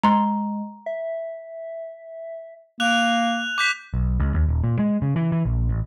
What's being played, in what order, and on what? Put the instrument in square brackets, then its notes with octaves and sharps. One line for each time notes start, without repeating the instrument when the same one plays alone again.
[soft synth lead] G#3 [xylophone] A#5 C6
[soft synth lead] E5
[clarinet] A#3 [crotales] F#6 F7
[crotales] D6 G6 B6
[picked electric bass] B1
C#2
D#2
D#1
A#2
G#3
C#3
E3
E3
A#1
A1